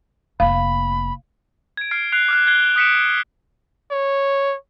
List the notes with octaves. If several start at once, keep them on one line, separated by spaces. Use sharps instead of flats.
F1 A#3 F5 B5
G#6 D7
F6 G#6 C7 D7
F#6 C7 F7
D6 F6 F#6
F#6 G#6 C7 G7
D#6 F#6 B6 C#7 D7 E7
C#5